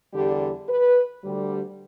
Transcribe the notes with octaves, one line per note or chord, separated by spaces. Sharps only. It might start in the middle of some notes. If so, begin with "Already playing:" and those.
E2 D3 G3 G4
B4
D2 D3 G3